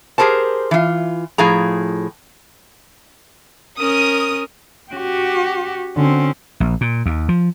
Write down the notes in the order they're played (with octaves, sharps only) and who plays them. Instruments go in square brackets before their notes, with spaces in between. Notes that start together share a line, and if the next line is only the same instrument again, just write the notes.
[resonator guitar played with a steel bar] G4 G#4 A#4 C5 A5
E3 F4
A2 F3 G#4 A#5
[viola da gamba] C#4 A#4 [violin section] D#6
[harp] C#4 [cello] F#4 G4
[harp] E7
[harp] D3 F#4 [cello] C4 C#4
[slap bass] A#1
A#2
D#2
F3